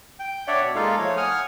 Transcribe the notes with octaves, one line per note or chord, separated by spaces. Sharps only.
G5
D4 C#5 D5 E5 F#5
B2
G#3 A#3 D#4 F4 A4 F5
F3 A3 C#5
F#5 G#5 D#6 F6